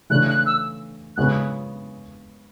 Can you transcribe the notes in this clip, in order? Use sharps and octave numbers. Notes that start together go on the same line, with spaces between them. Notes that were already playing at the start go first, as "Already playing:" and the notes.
C#3 E3 A3 D4 F#6
F#6
E6
C#3 G#3 B3 F#6